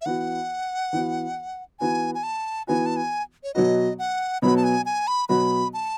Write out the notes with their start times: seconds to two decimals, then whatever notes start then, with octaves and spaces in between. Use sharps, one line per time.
0.01 E5
0.06 E3 B3 F#4 F#5
0.93 E3 B3 F#4
1.80 E3 B3 F#4 G#5
2.15 G#5
2.23 A5
2.67 E3 B3 F#4 G#5
2.86 A5
2.96 G#5
3.44 C#5
3.54 B2 F#3 B3 F#4 D#5
3.99 F#5
4.42 B2 F#3 B3 F#4 B5
4.57 A5
4.64 G#5
4.86 G#5
5.07 B5
5.29 B2 F#3 B3 F#4 B5
5.74 A5